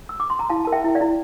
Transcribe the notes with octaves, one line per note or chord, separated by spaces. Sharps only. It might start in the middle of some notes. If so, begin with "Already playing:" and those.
E6
D6
C6
A#5
E4 F5 A5
A#4 A5
E5 G5
E4 E5
D5 F5
E4